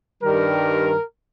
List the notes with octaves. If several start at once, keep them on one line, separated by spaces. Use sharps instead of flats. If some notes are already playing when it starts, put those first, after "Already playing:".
G2 D#3 G3 A#4